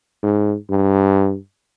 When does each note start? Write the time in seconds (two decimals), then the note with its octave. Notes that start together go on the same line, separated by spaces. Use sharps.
0.23 G#2
0.70 G2